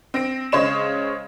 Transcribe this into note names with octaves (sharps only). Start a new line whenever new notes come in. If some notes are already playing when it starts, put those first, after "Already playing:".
C4 A#6 D7
C#3 G#3 C5 C#5 E7